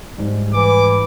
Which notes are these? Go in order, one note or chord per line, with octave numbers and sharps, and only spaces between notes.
G#2 G3
E3 D6